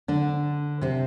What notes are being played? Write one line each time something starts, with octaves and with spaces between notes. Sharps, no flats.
D3 D4
C3 C4